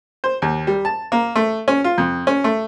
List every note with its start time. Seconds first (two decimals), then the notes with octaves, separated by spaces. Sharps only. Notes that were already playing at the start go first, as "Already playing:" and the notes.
0.24 C5
0.42 D#2
0.67 G3
0.85 A5
1.12 A#3
1.36 A3
1.68 C#4
1.84 F4
1.98 F2
2.27 C#4
2.44 A3